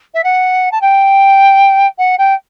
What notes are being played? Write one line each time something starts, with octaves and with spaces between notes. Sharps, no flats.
E5
F#5
A5
G5
F#5
G5